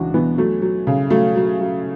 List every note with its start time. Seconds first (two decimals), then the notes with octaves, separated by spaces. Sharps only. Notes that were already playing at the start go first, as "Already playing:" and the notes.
Already playing: C#2 E3 D4 F#4
0.14 E3 B3
0.38 F#3 A3
0.62 F#3
0.87 C#3
1.10 F#3 A3
1.36 F#3
1.60 F#3